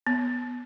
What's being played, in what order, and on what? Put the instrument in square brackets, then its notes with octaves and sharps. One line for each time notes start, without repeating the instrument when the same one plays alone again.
[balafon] B3